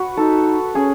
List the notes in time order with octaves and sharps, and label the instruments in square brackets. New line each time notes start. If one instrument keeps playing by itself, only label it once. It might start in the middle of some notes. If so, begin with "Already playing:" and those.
Already playing: [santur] F#4 B4
[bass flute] D#4 [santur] A4
[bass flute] C#4 [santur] G#4